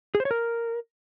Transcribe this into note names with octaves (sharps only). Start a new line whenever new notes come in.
G#4
C5
C#5
A#4